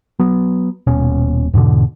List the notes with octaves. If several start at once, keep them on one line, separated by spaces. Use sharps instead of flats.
F#3 B3
D#1 B2 C#4
E2 G#2 B2 D3